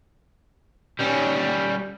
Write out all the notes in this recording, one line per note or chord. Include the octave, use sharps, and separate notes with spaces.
G3 C#4